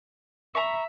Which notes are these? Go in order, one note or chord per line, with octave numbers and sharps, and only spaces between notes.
E5 A#5 B5 C#6